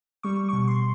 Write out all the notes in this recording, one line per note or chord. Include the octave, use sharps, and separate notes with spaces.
G3 C#6
B2 C#6
C6